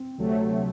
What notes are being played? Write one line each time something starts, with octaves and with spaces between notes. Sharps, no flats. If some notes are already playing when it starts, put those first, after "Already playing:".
Already playing: C4
D2 C3 F#3 A3